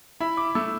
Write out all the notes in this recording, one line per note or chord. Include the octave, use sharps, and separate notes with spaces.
E4 B5
D6
A3 E6